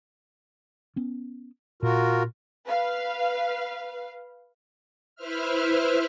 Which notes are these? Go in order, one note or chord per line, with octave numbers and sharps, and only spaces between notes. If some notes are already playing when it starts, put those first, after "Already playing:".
B3 C#4
A#2 F4 F#4 A#4
B4 F5
E4 B4 C5 E5 F6